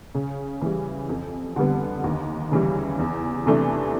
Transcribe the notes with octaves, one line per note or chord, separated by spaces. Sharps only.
C#3
E3 G3
F2
D3 G3 B3
D#2
C#3 E3 G3
E2
C3 E3 A3 D4